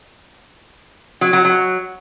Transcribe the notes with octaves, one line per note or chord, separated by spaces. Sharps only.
F#3
F#3
F#3